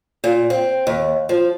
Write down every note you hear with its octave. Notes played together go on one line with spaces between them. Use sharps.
A#2
C4
D#2
F3